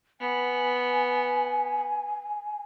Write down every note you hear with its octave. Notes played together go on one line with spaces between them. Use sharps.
B3 G#5